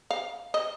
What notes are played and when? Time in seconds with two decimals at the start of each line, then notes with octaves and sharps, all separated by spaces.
0.11 F5
0.54 D#5